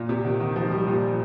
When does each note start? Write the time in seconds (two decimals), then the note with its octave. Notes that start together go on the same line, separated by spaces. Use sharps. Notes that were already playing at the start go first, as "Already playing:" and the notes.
Already playing: A#2
0.09 C3
0.25 D#3
0.40 D#3
0.56 F3
0.71 G3
0.87 A#2